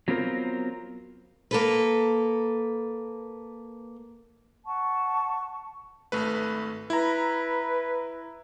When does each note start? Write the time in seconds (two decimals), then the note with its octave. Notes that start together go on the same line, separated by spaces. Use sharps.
0.08 F#3 B3 C4 F4 A#4
1.51 A#3 A4 B4
4.66 F#5 A5 C#6
6.12 G#1 A3 B4
6.90 E4 B4 A#5